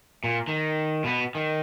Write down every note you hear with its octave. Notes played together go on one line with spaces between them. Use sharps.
A#2
D#3
B2 B3
D#3